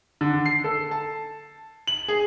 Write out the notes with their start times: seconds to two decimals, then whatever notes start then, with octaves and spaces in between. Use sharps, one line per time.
0.21 D3
0.46 C7
0.64 A4
0.91 A5
1.87 F#7
2.08 G#4